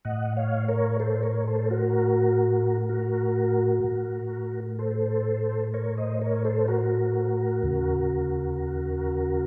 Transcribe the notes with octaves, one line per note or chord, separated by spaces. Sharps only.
A2 D#5 F#5
C#5 F5
A#4 C#5
A4 C5
A#4 C#5
A4 C5
F#4 A#4
F#4 A#4
A2
A4 C5
A#4 C#5
C5 D#5
A#4 C#5
A4 C5
F#4 A#4
D#2 C#3